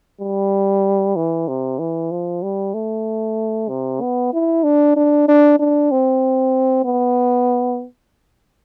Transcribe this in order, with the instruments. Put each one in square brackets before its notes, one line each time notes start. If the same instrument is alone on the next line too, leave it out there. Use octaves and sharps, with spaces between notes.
[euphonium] G3
E3
C3
E3
F3
G3
A3
C3
B3
E4
D4
D4
D4
D4
C4
B3